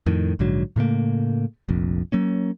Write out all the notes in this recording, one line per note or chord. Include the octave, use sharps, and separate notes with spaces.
F2 A2 D#3
A#1 G#2 D3 F#3
A2 C#3 A3 A#3
F1 A#1 F2
F#3 A#3 C#4